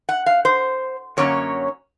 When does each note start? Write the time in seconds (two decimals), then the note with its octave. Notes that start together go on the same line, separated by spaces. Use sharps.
0.09 F#5
0.26 F5
0.45 C5
1.17 F#2 D3 F#3 A#3 C#4 C#5